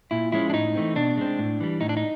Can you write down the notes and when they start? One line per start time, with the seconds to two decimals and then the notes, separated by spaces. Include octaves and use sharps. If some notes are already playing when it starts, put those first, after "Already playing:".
0.11 A#2 E4
0.32 F3 G#3 C#4 E4
0.50 D4
0.53 A2 D#4
0.75 E3 A3 C4
0.96 B2 D4
1.18 G#3 C4
1.39 A2
1.60 E3 G3
1.81 A2 D#4
1.89 D4
1.97 D#4